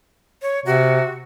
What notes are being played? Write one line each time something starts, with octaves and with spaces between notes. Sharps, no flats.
C#5
C3 F#4